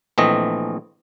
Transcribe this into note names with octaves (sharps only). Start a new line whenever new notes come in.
A#1 E3 A3 C4 D#5